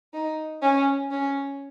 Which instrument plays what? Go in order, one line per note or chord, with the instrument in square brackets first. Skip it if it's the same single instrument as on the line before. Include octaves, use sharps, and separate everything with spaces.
[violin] D#4
C#4
C#4